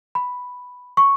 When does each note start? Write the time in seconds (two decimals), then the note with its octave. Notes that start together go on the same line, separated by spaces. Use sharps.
0.15 B5
0.97 C#6